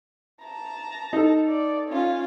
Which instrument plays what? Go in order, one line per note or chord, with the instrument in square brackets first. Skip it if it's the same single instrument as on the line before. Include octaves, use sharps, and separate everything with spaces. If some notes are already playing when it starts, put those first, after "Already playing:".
[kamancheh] A5 A#5
[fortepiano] D#4 A4
[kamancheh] D5
C#4 F4